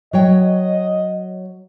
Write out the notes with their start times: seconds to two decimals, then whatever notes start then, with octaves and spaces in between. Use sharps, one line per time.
0.13 F#3 C#5 D#5 G5